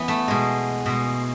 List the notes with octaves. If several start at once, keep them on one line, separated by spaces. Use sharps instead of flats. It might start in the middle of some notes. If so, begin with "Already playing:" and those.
Already playing: E3 B3
A3
B2 G#3
B2 G#3